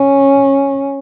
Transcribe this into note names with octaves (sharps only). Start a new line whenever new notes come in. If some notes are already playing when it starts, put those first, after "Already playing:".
Already playing: C#4